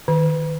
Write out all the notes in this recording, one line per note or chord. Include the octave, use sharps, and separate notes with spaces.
D#3